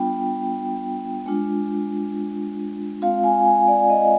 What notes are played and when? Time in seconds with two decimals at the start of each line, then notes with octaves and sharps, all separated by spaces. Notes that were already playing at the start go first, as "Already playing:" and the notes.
Already playing: G3 B3 D4 F4 G5
1.26 G#3 D4 F4
3.02 G#3 C4 F4 F5
3.24 G#5
3.46 G#5
3.68 D5
3.90 D#5